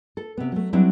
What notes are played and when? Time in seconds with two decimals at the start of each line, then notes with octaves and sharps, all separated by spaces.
0.17 A4
0.38 C3 B3
0.52 F#3 A3
0.73 F#3 G3 C4 D4 E4